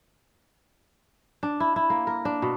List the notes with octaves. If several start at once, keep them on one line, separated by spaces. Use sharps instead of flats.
D4
E4
E4
A#3
A#4
D4
B2